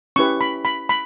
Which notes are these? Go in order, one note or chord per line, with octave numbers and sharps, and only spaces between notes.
C#4 E4 G4 B4 C#6
B5
B5
B5